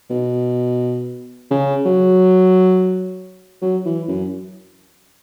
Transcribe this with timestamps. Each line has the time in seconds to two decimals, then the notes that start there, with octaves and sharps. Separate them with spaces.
0.10 B2
1.51 C#3
1.85 F#3
3.61 F#3
3.85 E3
4.08 F#2